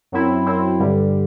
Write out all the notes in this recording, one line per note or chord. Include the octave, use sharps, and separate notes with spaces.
F#2 F#3 C4 E4
F#2 F#3 C4 E4
G2 D3 G3